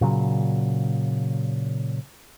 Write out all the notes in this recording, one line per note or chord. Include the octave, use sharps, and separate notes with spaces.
A#2 C#3 F#3